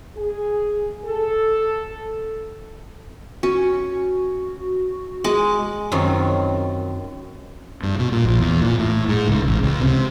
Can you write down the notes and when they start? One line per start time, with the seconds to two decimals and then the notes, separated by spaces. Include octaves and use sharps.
0.17 G#4
1.05 A4
3.43 C#4 F#4
5.24 G#3 D6
5.92 F#2 D#3 F#3 C4 F4
7.83 G2
7.99 B2
8.12 A#2
8.25 A#1
8.39 E2
8.61 A#2
8.79 A2
9.08 G#2
9.28 C#2
9.46 A1
9.63 C#2
9.80 C3